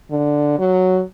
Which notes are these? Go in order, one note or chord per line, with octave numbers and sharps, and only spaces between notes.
D3
F#3